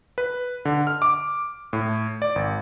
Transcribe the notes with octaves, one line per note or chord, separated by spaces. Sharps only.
B4
D3
F6
D6
A2
D5
G#1